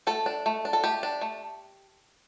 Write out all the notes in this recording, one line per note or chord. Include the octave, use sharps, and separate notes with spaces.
A3 A4
D4
A3
D4
A4
A3 G4
D4
A3